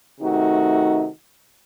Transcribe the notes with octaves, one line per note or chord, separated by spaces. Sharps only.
C3 D#3 A3 D#4 F#4